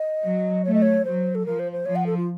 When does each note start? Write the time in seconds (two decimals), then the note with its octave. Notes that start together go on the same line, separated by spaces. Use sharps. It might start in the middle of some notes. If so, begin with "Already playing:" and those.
Already playing: D#5
0.23 F#3
0.65 A3 C#5
0.74 D#5
0.82 C#5
1.05 F#3 C5
1.35 A4
1.45 F3 A#4
1.59 C5
1.72 C5
1.85 F3 C#5
1.95 F#5
2.06 A4
2.17 F4